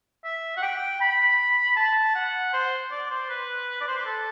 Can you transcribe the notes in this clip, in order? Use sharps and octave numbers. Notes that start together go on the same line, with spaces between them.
E5
F#5
G5
B5
A5
F#5
C5
D5
C5
B4
D5
C5
B4
A4